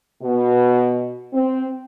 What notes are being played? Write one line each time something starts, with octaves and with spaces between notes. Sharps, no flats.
B2
C4